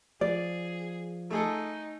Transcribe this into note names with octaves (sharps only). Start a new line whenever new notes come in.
F3 G#4 D5
A3 D#4 G#4 A4